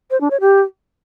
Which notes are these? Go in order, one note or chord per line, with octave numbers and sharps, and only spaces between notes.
C5
D4
C#5
G4